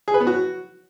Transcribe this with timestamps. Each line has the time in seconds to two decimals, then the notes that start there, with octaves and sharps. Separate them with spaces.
0.08 G#4
0.14 B4
0.20 B3
0.27 F#4